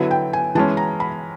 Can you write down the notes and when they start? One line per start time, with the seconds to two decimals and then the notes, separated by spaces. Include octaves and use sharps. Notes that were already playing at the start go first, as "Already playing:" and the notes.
Already playing: D3 F#3 B3 E4
0.11 G5
0.33 G#5
0.55 E3 G#3 C#4 A5
0.77 A#5
1.00 B5